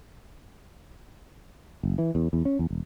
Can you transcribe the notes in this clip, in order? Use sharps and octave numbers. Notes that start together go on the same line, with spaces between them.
F#1
E3
E2
E2
C#4
E2
E1